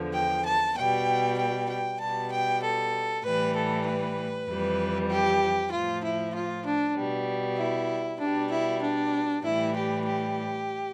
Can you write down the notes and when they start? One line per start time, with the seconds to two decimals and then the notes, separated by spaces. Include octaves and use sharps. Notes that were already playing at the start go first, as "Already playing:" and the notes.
Already playing: E2 D3 F3
0.14 G5
0.45 A5
0.76 B2 G3 G5
1.38 G5
1.69 G5
2.00 B2 G3 A5
2.31 G5
2.62 A4
3.24 A2 E3 G3 B4
3.55 A4
3.86 B4
4.49 F2 E3 G3
5.10 G4
5.72 A2 F3 F4
6.03 E4
6.35 F4
6.65 D4
6.96 B2 G3
7.58 E4
8.20 B2 G3 D4
8.50 E4
8.82 D4
9.44 A2 E3 G3 E4
9.76 G4
10.06 G4